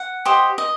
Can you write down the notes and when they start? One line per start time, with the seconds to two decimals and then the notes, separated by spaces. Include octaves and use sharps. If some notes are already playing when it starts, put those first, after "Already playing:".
Already playing: F#5
0.25 G4 C5 D#5
0.58 D#5